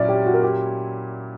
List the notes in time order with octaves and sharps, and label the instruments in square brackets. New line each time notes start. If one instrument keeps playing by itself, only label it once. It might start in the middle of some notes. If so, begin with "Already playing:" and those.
Already playing: [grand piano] A#2 F#3 C#4 E4 [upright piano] D5 E5
[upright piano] G4
F#4
A#4
G4